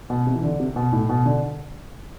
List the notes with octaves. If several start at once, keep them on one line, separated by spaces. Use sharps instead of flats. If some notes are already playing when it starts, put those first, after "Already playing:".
B2
C3
E3
D3
C3
B2
A2
B2
D3